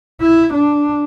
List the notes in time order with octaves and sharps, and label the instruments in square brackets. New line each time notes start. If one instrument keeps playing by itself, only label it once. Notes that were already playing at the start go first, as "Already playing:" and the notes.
[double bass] E4
D4